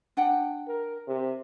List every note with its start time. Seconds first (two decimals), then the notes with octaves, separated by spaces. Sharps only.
0.17 D4 F#5 G5
0.68 A#4
1.07 C3